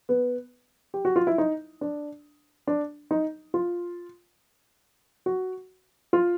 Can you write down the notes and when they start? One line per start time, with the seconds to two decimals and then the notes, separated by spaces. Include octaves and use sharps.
0.09 B3
0.94 G4
1.05 F#4
1.16 F4
1.27 E4
1.38 D#4
1.81 D4
2.67 D4
3.11 D#4
3.54 F4
5.26 F#4
6.13 F4